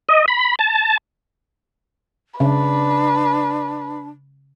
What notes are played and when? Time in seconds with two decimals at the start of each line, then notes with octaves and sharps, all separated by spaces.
0.09 D#5
0.28 B5
0.59 A5
2.40 C#3 D4 B4